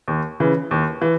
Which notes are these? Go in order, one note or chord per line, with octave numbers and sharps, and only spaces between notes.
D#2
C#3 E3
D#2
E3